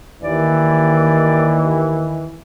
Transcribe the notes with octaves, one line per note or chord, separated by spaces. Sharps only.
D#2 E3 D5